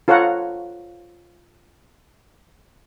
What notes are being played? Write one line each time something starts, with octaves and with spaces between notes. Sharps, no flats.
F4 A4 C#5 F5 F#5 A#5